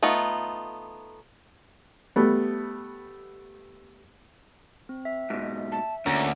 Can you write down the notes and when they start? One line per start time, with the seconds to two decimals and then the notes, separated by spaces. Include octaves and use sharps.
0.03 A3 B3 D#4 F4
2.16 G3 A3 B3
4.89 C4
5.05 E5
5.30 G#2 B2
5.72 A5
6.06 D2 A#2 D3 C#4 A#5